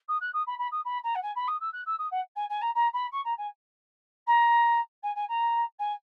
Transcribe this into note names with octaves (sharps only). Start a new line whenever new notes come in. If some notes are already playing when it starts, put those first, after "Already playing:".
D#6
F#6
D#6
B5
B5
D#6
B5
A#5
F#5
G#5
B5
D#6
E6
F#6
E6
D#6
F#5
G#5
G#5
A#5
A#5
B5
C#6
A#5
G#5
A#5
G#5
G#5
A#5
G#5